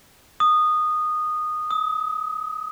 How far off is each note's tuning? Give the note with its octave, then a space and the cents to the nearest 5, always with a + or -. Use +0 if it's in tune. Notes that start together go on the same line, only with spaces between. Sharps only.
D#6 -15
D#6 +35